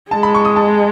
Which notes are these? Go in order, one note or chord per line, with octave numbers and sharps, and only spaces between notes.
G#3 A5
B5
C#6
D#6
A5